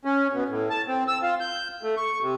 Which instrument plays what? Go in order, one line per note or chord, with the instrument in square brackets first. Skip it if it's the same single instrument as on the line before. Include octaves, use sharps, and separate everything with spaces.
[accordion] C#4
B2
A2
A5
C4
E6
F4
G6
A3
C#6
C3